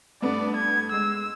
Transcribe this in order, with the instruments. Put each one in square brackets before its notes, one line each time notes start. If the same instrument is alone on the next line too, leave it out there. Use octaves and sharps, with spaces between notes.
[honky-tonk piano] G2 A3 B3 [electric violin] D5
[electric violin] G#6
[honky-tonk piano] G#3 [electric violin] E6